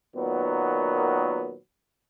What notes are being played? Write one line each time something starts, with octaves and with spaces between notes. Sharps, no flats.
A#2 D#3 F#3 B3